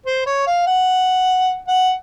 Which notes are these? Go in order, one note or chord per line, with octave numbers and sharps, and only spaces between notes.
C5
C#5
F5
F#5
F#5